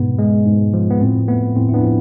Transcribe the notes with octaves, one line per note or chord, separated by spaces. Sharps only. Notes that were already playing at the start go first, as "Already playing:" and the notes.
Already playing: G#2 B2 B3
G#3
G#2
F3
B3
A2 C4
A3 B3
A2 C4
E4
B3 D4
F3